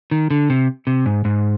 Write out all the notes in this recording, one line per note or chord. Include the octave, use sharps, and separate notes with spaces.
D#3
D3
C3
C3
G#2
G#2